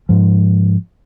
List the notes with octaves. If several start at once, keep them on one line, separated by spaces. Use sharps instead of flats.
G#2 F3